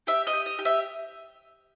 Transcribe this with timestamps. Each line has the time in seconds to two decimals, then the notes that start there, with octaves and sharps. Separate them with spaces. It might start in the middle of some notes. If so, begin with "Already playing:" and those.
0.07 G4 E5
0.27 D#5
0.33 G4
0.46 D#5
0.59 G4
0.65 E5